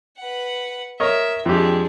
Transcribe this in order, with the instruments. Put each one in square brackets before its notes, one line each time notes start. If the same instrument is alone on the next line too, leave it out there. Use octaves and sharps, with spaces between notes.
[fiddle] B4 F#5
[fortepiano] A#4 C#5 D#5 [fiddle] E5
[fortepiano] F2 G4 [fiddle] G#3 D4